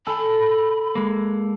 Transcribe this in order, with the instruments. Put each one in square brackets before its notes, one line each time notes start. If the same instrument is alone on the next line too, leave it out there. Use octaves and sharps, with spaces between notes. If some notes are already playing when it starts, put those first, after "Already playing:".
[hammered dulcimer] A4 [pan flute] B5
[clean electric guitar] G#3 A#3